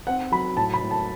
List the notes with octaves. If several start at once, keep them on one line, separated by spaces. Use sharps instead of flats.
C4 F#5
F#3 B5
A2 A5
B5
A2
A5